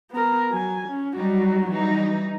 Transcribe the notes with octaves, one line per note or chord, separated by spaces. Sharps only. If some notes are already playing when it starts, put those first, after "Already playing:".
B3 A#4
F#3 G#5
C#4
F#3 G3 D#4 F#4
E3 G3 D#4